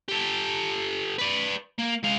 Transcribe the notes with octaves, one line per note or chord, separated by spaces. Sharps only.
G4 A4
B4 D5
A#3
G#3 F5